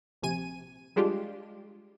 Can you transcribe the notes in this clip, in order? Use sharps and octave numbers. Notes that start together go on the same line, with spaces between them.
A#1 C3 G#5 D#7
G3 G#3 D4 F4 G4